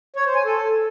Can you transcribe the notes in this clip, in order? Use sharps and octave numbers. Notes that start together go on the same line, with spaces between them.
C#5
C5
G#5
A4